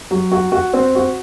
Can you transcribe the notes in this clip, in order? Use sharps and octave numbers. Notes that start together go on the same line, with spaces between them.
F#3
F#4
F#4
C4
F#4